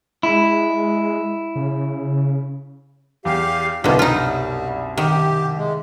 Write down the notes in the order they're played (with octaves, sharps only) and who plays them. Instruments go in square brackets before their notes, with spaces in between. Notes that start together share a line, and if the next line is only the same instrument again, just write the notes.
[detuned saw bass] G#3 [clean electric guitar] E4
[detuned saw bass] C#3
[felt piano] E2 [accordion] G4 F5
[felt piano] C2 F#2 [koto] B2 D3 [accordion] D#4 F4 G4
[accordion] G3 [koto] D#4 F4
[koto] D#3 [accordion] G4
[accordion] G#3